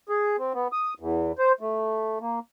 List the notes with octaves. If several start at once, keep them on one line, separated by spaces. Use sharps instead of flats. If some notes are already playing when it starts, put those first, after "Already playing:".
G#4
C4
B3
D#6
E2
C5
A3
A#3